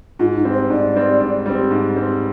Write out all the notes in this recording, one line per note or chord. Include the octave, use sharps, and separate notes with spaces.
G#2 F4
D#4
G3 C4
C5
G#2 D5
G3 C4
G#2
G3 C4
G#2
G3 C4